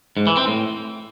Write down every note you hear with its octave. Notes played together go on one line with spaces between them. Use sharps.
G#2
E3
C4
A2